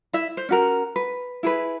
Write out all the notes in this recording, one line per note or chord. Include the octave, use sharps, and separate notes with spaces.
E4 E5
C5
C#4 F#4 A#4
B4
E4 G#4 B4